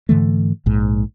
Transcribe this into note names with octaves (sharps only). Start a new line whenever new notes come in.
G#2 D3 E3 A3
A#1 G#2